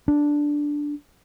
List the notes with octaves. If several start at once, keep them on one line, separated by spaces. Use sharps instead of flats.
D4